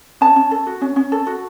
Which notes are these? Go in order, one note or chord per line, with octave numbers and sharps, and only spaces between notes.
C#4 A5
C#4
A4
F#4
C#4
C#4
A4
F#4